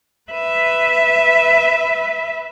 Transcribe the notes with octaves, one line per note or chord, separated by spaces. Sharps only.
B4 E5